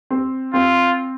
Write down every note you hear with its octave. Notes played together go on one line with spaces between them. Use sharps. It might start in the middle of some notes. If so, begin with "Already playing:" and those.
C4
C4 F4